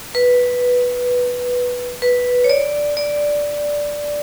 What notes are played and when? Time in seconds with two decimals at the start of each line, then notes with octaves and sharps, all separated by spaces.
0.15 B4
2.02 B4
2.44 C#5
2.50 D5
2.97 D5